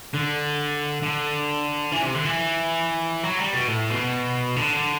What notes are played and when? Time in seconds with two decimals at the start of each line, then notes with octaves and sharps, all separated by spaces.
0.14 D3
1.02 D3
1.92 E3
2.02 C3
2.13 D3
2.24 E3
3.24 F#3
3.38 G3
3.53 B2
3.68 A2
3.90 B2
4.56 D3